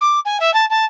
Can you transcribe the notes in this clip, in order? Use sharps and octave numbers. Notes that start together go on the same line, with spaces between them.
D6
G#5
E5
A5
A5